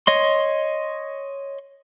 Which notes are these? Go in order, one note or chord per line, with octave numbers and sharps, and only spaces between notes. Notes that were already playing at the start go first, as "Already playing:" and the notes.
C#5 D#5 C6